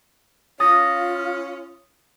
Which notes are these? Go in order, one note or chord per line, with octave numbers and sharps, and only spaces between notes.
C#4 F4 D#6 A6 A#6